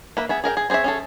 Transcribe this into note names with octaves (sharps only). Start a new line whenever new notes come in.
A#3 B4 E5
B3 G#4 E5
G#4 A#4 E5 G5
G#4
C4 G#4 B4 C#5 E5
C#4 G#4 A4